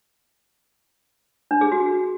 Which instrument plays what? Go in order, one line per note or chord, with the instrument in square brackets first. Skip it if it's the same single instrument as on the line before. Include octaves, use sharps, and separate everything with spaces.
[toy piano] D4
G#4
F#4